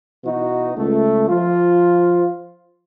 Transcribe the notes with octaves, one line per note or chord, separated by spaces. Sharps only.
B2 E3 D#4 F#4
C#2 A3
F3 F4